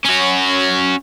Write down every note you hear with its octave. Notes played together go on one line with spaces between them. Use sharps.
C#4 F#4